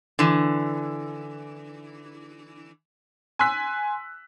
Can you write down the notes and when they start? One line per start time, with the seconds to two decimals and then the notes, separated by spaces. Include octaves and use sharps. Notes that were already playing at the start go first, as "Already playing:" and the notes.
0.19 D3 E3
3.39 G#5 C6 E6 F#6 B6